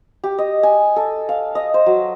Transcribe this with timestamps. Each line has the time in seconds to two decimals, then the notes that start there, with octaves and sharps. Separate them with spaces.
0.24 G4
0.38 D#5
0.63 G#5
0.96 A4
1.29 F5
1.55 D#5
1.74 C5
1.86 F#3